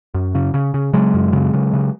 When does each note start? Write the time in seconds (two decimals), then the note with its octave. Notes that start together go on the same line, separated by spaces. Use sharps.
0.14 F#2
0.35 C#3
0.54 C#3
0.74 C#3
0.93 C#3 F#3 G#3
1.14 F#2
1.33 C#3
1.54 C#3
1.73 C#3